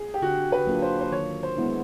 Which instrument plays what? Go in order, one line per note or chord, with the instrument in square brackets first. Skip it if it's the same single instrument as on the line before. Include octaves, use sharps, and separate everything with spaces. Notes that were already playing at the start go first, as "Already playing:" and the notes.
Already playing: [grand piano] G#4
G4
[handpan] D3 [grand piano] F#4
[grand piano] B4
[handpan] F#3 A#3 D4 F4
[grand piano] C5
C5
[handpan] D#3 [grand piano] C#5
[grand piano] C5
[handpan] G#3 B3 E4